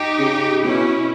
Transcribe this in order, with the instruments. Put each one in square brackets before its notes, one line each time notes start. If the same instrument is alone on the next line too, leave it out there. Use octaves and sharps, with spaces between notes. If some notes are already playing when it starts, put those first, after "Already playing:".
Already playing: [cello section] D#4 G4
[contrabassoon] C#3
[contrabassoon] B2 [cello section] C#4 E4